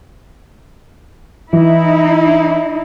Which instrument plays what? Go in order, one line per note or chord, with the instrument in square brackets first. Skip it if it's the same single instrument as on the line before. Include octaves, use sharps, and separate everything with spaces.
[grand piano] E3 [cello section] D#4 E4